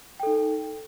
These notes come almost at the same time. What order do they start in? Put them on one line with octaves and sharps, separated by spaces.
G5 A4 D#4